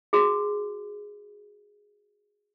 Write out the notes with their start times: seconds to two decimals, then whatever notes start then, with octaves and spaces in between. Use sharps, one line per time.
0.13 F#4 G#4